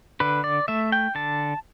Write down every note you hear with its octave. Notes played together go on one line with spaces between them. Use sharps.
D3 B4
D5
A3 E5
G5
D3 A5